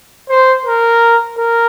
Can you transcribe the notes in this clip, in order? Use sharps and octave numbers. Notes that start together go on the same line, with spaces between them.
C5
A#4
A#4